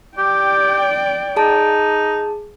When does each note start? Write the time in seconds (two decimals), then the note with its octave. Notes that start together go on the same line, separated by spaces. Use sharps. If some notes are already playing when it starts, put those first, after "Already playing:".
0.18 G4 D5 G5
1.36 D#4 G#4 A5